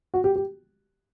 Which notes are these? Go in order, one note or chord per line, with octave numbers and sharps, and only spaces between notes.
F#4
G4
G4